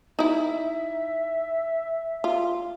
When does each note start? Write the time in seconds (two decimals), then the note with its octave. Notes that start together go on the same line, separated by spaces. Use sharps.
0.19 D#4 E4 E5
2.24 F4